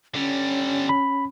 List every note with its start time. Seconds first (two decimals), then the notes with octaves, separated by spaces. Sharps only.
0.14 D3 G3 C#4
0.89 B5